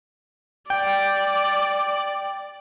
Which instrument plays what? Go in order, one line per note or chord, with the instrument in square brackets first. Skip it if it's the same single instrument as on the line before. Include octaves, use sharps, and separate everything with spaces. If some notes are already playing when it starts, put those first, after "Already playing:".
[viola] D5 [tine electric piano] G5